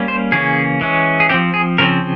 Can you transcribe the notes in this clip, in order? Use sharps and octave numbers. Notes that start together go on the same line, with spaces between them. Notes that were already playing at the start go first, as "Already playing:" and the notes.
Already playing: G3 A#3 C#4
C5
C#3 E3 A#3 C#4 G#4
E3 G#3 C#4
G#4
F3 C4 G4
G#4
C#3 F3 C4 A#4